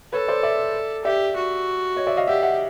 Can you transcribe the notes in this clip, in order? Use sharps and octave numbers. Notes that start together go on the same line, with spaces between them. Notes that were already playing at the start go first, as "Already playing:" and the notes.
A4 B4 C#5
C5 D5
D5 E5
G4 D5 E5
F#4
C#5 D#5
D5 E5
D#5 F5
G4 E5 F#5
E5 F#5